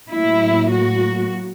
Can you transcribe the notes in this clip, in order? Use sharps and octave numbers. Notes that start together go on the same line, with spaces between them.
A2 F#3 A#3 E4
F#4